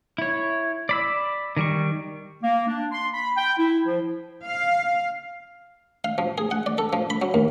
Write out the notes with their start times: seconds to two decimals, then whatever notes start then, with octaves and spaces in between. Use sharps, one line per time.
0.18 E4 C#5
0.89 D5 B5 E6
1.57 D#3 G3 C#6
2.43 A#3
2.68 D4
2.92 C6
3.14 B5
3.37 G5
3.58 E4
3.86 F3
4.46 F5
6.04 F5
6.18 F3
6.38 G#4
6.51 F#5
6.66 D5
6.78 A4
6.93 F3
7.10 B5
7.22 F#3
7.34 D#2